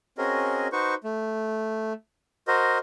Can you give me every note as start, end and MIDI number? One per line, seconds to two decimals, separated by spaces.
0.18 0.68 60
0.18 0.68 61
0.18 0.68 66
0.18 0.68 68
0.18 0.68 70
0.18 0.68 75
0.72 0.95 63
0.72 0.95 66
0.72 0.95 71
0.72 0.95 72
0.72 0.95 85
1.04 1.93 57
2.48 2.78 66
2.48 2.78 70
2.48 2.78 72
2.48 2.78 75